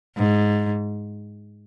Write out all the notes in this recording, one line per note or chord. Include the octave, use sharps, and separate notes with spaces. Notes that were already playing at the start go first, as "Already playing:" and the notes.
G#2